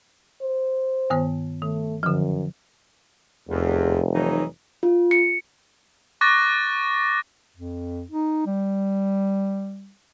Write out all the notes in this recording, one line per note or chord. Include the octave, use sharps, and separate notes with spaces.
C5
G2 D#3 B3
D#3 A3
F#2 D3 F3
F1 E2
E3 F#3 D#4
F4
C#7
C#6 D6 F#6 A6 A#6
F2
D#4
G3